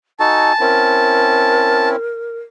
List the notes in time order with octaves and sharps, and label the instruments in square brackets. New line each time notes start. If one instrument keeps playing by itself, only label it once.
[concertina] D#4 F#4 A4 [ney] G#5 [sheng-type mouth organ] A5
[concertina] C4 C#4 E4 [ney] A#4